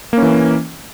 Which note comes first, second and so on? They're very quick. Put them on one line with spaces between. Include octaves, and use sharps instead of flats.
A#3 C#4 E3